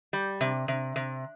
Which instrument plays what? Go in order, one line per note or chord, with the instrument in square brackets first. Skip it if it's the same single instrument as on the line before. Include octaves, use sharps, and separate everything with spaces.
[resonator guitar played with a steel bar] G3
C3
C3
C3